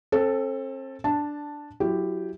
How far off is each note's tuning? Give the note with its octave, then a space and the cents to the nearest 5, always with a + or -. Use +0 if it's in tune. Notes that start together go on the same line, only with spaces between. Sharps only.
C4 +35 A4 +0
D4 +0 A5 +0
F#3 +0 E4 +20 G4 +0